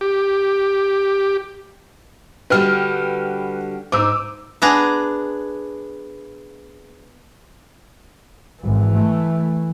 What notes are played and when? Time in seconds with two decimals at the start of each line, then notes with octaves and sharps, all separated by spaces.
0.01 G4
2.50 D3 G3 F#4 B4 G5 F6
3.92 G#2 D#4 D6 E6
4.62 B3 D4 G#4 A#5
8.63 G#1 E3
8.95 A3